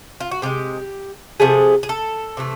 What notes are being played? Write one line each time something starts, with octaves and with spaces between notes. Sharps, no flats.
F4
F#4
C3 F3 G#3 G4
C3 F3 A3 G#4
G#4
A4
C3 E3 A3